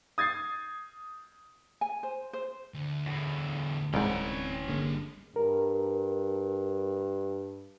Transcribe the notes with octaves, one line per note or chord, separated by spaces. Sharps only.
D#6 G#6 A6 C7
G#5
C5
C5
D2
E2 A2
D1 C2 G#2 E3 C4 C#4 G5 B5
G1 D3 G3 A#3 G#4
G2 A#4